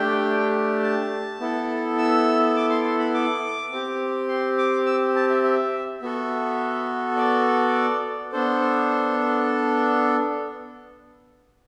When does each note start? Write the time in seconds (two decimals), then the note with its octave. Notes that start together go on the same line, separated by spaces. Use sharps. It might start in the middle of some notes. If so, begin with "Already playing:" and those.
Already playing: A3 D4 G4 G5
0.83 A5
1.40 B3 E4 A4
1.98 E6
2.56 D6
2.70 C6
2.84 C6
2.99 B5
3.14 D6
3.71 C4 G4
4.28 C6
4.58 D6
4.86 E6
5.16 A5
5.30 E5
5.44 E5
6.02 B3 F#4 A4 E5
7.17 D5
8.32 B3 D4 A4 C5